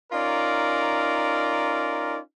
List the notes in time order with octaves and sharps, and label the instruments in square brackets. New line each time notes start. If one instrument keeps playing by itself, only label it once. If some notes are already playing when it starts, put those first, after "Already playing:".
[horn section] C#4 D#4 F4 A#4 D5